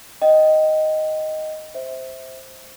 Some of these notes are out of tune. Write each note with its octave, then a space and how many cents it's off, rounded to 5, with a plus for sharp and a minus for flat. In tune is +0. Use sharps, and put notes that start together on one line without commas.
D#5 +0 G5 -15
C5 +0 E5 -15